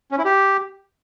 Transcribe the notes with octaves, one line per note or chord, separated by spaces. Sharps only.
C#4
E4
G4